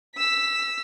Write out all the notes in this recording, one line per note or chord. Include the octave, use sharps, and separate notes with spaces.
E6 B6